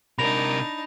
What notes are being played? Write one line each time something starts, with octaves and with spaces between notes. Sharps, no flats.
C3 D4 D#4 A#4 B5 A#6 F7